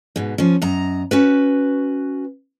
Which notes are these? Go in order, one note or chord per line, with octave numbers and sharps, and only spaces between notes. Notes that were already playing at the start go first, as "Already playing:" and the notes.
G#2 B2
F3 C#4
F#2 D#5 A#5
C#4 F#4 B4